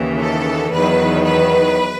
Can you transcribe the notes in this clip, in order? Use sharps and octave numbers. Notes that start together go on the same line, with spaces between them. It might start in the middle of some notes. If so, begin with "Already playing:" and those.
Already playing: D#2 C#3 E3
A4
E2 D#3 F#3 B4
B4